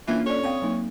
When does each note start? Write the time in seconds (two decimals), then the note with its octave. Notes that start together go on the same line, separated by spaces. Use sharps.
0.07 E3 A#3 C#4 D4 F4
0.26 A4 C#5 D5
0.43 C4 F5 G5 D#6
0.62 F#3 A#3 D#4